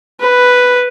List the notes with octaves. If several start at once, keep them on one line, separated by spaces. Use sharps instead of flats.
B4